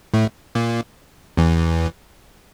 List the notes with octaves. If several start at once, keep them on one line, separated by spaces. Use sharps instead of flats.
A2 A3
A#2 A#3
E2 E3